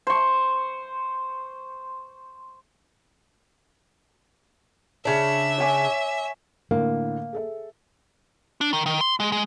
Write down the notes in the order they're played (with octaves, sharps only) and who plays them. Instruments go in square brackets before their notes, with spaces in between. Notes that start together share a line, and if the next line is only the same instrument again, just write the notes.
[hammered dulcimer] C5 C#6
[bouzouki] C#3 D4 [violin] E5
[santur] C#5 G#5 D6
[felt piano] A2 D3 [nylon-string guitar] A#3
[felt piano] G#4 A4 E5
[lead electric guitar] D4
D#3
D#3
C6
G#3
G#3